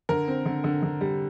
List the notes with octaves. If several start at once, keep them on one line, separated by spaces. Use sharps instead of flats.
D3 A#4
C4
D3
D3
D3
G3